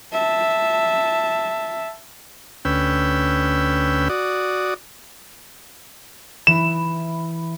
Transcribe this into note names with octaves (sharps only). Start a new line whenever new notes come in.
E5 A5
D2 C#4 B4 G5 E6
F#4 D5 D#6
E3 E4 E7